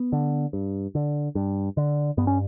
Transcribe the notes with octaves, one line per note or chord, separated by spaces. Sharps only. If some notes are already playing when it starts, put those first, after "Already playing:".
Already playing: B3
D3
G2
D3
G2
D3
G2 B3
C#4